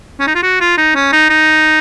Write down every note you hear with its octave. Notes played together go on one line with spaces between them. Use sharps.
C#4
D#4
F4
F#4
F4
D#4
C#4
D#4
D#4